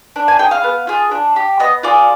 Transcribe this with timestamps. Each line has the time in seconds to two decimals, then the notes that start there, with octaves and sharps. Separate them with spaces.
0.16 D4
0.28 G#5
0.39 G#4 G5
0.51 F5
0.64 B3
0.87 F4 G#4
1.11 D4
1.36 G4
1.60 B3 D#5
1.83 F4 G#4 D5